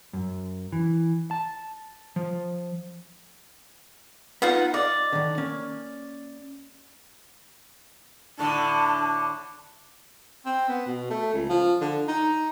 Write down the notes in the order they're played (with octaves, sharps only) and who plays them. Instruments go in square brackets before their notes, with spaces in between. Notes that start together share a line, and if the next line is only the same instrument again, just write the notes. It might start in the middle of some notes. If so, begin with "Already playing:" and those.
[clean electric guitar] F#2
E3
A5
F3
[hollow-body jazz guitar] B3 B4 [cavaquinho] D#4 F4 F#5
[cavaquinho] D5 [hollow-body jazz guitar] D#5 F5
[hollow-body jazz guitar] D3 D#3
A#3 C#4
[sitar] A2 D3 [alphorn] D4 [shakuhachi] A5
[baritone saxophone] C4
B3
B2
A3
C#2
F3
D3
D#4